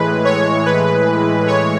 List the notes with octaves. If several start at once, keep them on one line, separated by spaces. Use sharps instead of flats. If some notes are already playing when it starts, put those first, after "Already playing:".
Already playing: A2 E3 G#3 B4
C#5
B4
C#5